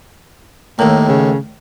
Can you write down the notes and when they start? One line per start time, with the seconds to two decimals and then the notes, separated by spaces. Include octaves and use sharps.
0.79 D#2 A2 A#3
1.08 C#3